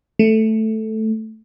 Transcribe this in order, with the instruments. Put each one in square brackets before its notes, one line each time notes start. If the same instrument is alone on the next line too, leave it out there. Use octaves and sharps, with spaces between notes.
[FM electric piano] A3